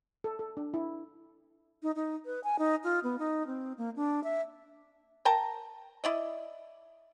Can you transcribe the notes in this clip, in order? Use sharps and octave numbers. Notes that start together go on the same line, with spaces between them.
A4
A4
D4
E4
D#4
D#4
B4
G#5
D#4
F4
B3
D#4
C4
A#3
D4
E5
A#4 G5 A5 A#5
E4 D5 D#5